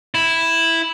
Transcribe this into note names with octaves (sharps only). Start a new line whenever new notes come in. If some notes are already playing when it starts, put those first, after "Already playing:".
E4